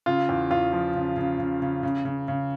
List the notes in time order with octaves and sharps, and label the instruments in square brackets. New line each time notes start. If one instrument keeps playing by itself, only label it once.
[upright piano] C#3 F4
E2
E2 F4
F3
C#3
C#3
C#3
C#3
C#3
C#3
C#3